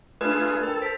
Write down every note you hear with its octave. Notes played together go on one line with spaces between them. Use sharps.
A3 D4 F4 G#4 B4 D5
A4 A#4 G5
C5 B6